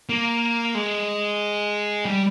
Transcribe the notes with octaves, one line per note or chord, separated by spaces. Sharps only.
A#3
G#3
G3